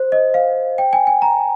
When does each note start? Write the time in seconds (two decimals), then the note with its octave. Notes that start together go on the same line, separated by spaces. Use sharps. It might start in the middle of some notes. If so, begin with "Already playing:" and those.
Already playing: C5
0.12 D#5
0.34 F5
0.78 G5
0.93 G#5
1.07 G#5
1.22 A#5